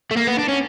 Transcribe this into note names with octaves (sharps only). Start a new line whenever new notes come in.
A3
A#3
B3
D4
C#4